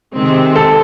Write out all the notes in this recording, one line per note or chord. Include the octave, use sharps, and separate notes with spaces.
C3 D#3 G#3 C4
A4